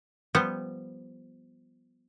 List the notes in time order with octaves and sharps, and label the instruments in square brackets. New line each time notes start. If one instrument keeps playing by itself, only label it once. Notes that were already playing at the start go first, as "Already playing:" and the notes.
[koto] F3 G3 B3